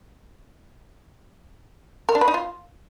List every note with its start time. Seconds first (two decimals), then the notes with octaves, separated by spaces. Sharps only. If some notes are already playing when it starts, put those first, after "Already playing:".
2.09 A#4
2.15 D4
2.21 B4
2.28 D#4
2.34 F4